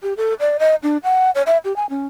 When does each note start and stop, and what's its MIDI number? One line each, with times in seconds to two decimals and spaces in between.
0.03 0.14 67
0.17 0.34 69
0.40 0.57 74
0.59 0.75 75
0.83 0.97 62
1.04 1.30 78
1.35 1.42 73
1.47 1.57 76
1.65 1.75 67
1.76 1.86 80
1.90 2.07 61